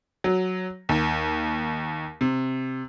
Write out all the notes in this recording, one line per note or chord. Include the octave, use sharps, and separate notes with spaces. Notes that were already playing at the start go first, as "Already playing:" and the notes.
F#3
D#2
C3